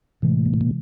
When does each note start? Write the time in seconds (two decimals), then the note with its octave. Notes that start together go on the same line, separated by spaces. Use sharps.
0.22 A2 C3 E3 G#3
0.46 A#2
0.54 A2
0.61 A#2